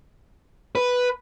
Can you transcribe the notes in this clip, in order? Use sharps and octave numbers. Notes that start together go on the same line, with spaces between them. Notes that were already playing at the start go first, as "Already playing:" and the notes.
B4